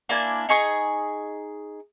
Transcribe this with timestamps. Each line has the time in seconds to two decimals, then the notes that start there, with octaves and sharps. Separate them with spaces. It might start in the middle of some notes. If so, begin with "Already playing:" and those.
0.09 A#3 D4 E4 G#5
0.49 D#4 G#4 C#6 D#6